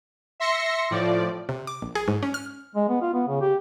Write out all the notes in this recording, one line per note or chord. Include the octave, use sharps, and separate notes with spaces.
E5 C6 A#6 C#7
A2 F3 D5
C3
D6
A#1
G#4
G#2
C#4
F6
G#3
B3
F4
B3
C#3
G4